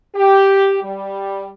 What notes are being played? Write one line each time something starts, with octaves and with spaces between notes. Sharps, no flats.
G4
G3